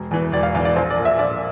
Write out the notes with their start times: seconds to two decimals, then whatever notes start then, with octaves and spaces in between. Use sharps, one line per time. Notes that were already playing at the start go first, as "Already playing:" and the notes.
Already playing: E1
0.11 E2 E3
0.32 E1 D5
0.43 F5
0.55 E2 F5
0.59 E3
0.65 D5
0.76 A#1 C5
0.91 D5
0.98 A#2
1.05 E5
1.19 A#1 D5